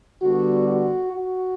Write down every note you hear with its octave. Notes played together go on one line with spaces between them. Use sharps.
D3 G3 B3 F#4
F#4
F#4